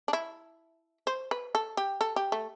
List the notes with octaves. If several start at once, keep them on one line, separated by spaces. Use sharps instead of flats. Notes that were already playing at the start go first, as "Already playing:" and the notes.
D4
E4
C5
B4
A4
G4
A4
G4
A3